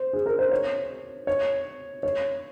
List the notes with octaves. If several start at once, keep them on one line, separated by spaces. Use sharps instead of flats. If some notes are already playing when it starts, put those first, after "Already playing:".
Already playing: C5
G#4
A#4
C5
C#5
C#5
C#5